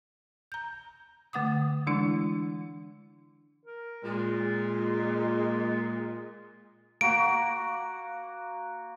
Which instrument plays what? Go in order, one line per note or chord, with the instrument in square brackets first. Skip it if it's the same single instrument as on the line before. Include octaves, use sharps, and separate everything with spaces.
[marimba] A#5 G6
D3 A3 F#5 D6 D#6
E3 G#3 D4 E4
[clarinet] A#4
[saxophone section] A#2 G#3 [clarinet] F4
[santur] A#3 F#4 [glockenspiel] D7